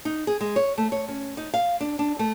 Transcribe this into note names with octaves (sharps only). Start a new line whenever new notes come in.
D#4
G#4
G#3
C#5
A3
C#5
C#4
D#4
F5
D4
D4
A3